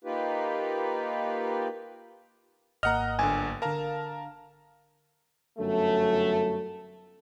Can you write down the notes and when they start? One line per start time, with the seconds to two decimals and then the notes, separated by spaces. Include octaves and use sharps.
0.04 A#3 D#4 F4 G4 B4
2.83 G#1 A#3 D#5 F#5 A#5 F6
3.19 G1 D3 G#5
3.62 D3 A#4 F5 A5 A#5
5.58 G1 F#2 A3